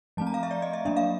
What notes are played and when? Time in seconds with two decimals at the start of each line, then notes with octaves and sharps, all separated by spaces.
0.17 F3 A3 C4 A5
0.27 A#5
0.34 F5
0.43 E5
0.51 D5
0.62 D#5
0.73 E5
0.85 F#3 A#3 D4 E5
0.97 F5